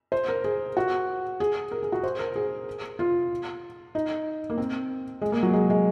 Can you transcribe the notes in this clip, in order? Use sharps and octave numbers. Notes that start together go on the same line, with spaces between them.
C5
A#4
G#4
F#4
G#4
A#4
G#4
F#4
C5
A#4
G#4
F4
D#4
A#3
C4
G#3
A#3
F#3
G#3
G#3